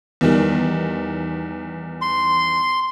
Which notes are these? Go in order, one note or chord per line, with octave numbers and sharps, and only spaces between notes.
E2 D#3 G3
C6